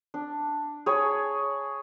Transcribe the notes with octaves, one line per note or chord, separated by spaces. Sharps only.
D4
G#4 C#5 G#5 B5